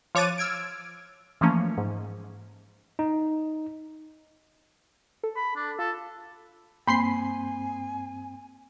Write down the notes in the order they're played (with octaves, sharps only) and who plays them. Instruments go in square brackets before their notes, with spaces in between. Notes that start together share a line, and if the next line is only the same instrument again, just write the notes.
[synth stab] F3 C#5 D6 F#6 A6 D#7
E6 F6 G#6 D7
E3 F3 A3 A#3 C#4
G#2
[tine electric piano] D#4
[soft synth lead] A4
[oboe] B5
D4
[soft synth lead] F4 [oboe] A4
[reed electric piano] G2 C4 [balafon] A#3 [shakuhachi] G#5 [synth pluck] B5 C6 C7